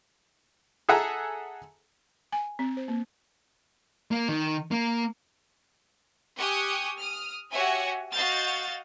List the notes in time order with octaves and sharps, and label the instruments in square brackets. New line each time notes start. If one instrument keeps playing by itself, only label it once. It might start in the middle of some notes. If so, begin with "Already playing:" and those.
[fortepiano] G#4 A4 E5 F#5 G#5 A#5
[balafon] G#5
C4
C5
A#3
[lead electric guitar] A#3
D#3
A#3
[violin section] G4 G#5 C#6 D#6 F#6
D#6 F6
F#4 G4 C#5 E5 F#5 G#5
F#4 D#5 F5 F6 G6 A6